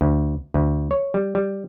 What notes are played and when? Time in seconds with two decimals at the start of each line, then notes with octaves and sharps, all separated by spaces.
0.01 D2
0.54 D2
0.91 C#5
1.14 G3
1.35 G3